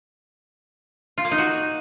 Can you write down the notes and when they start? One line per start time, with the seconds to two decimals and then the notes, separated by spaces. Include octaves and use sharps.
1.18 F4
1.24 A#3
1.31 D#4
1.38 F#4